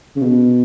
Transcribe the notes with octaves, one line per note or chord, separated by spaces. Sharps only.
C#3
B2